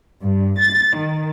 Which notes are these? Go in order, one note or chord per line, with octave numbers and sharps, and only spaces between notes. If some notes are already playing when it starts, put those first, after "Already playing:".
G2
A6
D#3